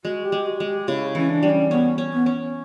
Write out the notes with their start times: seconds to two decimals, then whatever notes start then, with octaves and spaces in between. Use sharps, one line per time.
0.05 G#3 F#4
0.25 G4
0.32 G#3
0.46 F#4
0.60 G#3
0.67 G4
0.88 C#3 E4
1.15 E3 C#4
1.29 D4
1.43 G3
1.49 C#4
1.71 B3 C#4
1.98 C#4
2.13 B3
2.26 C#4